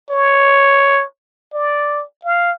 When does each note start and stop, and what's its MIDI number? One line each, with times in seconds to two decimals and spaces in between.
0.10 1.03 73
1.54 2.03 74
2.24 2.52 77